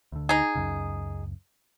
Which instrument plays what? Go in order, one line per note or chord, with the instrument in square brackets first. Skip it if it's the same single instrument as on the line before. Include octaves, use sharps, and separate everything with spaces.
[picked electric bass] D2 D3
[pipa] D#4 G#4
[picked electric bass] C#2 F#2 C#3